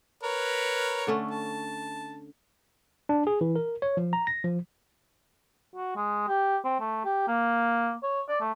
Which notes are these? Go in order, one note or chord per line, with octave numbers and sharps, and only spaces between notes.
A#4 B4 C#5
D3 A3 C#4
A5
D4
G#4
E3
A#4
C#5
F3
A#5
A#6
F3
F#4
G#3
G4
C4
A3
G4
A#3
C#5
D5
A3